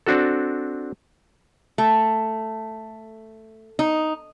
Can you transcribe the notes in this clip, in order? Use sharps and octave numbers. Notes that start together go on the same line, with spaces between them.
C4 D4 F#4 A4
A3
D#4